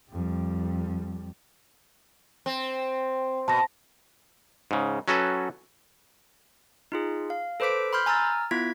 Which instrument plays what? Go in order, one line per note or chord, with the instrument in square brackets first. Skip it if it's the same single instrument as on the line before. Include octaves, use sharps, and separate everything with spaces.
[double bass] F2 G3
[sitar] C4
[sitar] B2 [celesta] A5 A#6
[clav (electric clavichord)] G#2 C#3
F#3 C#4 F#4 A4 B4
[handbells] D#4 F4 G#4
F5
A4 B4 C5 D6 B6 D7
B5 C6 F6 G6
G#5 A#5 E6 F6 A6
B3 E4 F4 G#6 B6